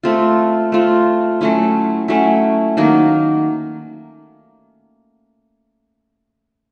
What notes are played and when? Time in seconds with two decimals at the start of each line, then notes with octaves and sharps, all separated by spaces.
0.03 A3 C4 F4
0.72 A3 C4 F4
1.41 F#3 A3 C#4 E4
2.08 F#3 A3 C#4 E4
2.77 D#3 F#3 A#3